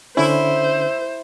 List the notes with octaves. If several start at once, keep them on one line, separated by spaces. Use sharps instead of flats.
D3 C#4 E4 C5